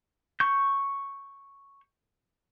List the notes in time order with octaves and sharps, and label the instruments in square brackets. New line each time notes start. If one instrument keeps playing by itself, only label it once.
[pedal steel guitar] C#6 G6